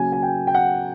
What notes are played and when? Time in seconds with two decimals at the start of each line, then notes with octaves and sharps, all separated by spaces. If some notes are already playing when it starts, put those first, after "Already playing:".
Already playing: C#3 F#3 A#3 G#5
0.13 G#5
0.23 G5
0.47 G5
0.55 F#5